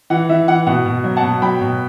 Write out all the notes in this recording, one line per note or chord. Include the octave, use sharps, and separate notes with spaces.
E3 F#5
E3 E5
E3 F#5
B2 F#5
B2
F#3
F#5 A5
B2
F#3 G5 B5
B2